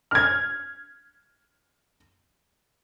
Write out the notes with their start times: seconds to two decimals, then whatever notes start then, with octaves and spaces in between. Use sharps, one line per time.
0.11 F6 G#6